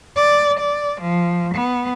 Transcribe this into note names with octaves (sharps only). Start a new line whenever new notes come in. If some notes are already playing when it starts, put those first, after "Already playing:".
D5
D5
F3
B3